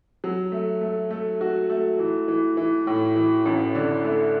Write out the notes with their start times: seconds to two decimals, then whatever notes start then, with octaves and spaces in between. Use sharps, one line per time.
0.24 F#3
0.52 A3
0.81 A3
1.11 A3
1.41 F#4
1.70 A3
1.99 E3
2.28 E3
2.57 E3
2.87 A2
3.16 E3
3.46 A1
3.75 D3
4.04 A3